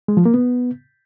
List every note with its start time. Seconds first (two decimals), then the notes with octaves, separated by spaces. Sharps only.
0.08 G#3
0.17 F3
0.25 A#3
0.34 B3